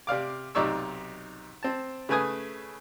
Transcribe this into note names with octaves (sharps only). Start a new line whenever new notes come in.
C3 D5 F5 D6
B1 C3 D#4 D5 C#6 E6
C4 A5
C#3 A3 B4 G#5 D#6